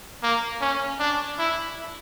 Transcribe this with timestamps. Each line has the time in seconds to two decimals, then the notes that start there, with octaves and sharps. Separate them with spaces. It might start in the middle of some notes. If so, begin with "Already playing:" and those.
0.23 A#3
0.61 C#4
0.99 D4
1.38 E4